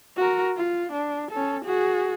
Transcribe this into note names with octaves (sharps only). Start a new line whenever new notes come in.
F#4 A#4
F4
D4
C#4 A4
F#4 G#4